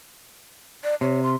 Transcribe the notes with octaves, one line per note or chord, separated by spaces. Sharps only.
D5
C3 C#5
C6